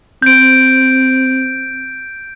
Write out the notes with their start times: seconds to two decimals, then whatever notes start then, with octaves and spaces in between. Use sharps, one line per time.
0.22 C4 G6 D7